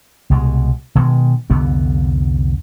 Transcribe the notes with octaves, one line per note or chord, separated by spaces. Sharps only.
C2 B2 G#3
B2 D#3 F#3 G#3
C2 F2 D3 B3